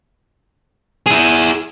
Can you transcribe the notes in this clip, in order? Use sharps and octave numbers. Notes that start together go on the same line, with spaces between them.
E4 G#4